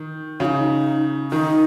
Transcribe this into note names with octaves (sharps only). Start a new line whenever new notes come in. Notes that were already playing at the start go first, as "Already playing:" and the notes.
Already playing: D#3
C#3 D#4 F#4
D#3 D#4